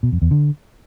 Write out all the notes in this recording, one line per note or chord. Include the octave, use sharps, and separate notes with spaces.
B2
F2
E2
D3